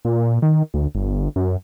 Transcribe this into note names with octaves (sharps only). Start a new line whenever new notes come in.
A#2
D#3
D2
G1
F#2